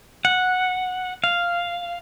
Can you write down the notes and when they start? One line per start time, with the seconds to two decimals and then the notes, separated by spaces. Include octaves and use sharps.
0.25 F#5
1.24 F5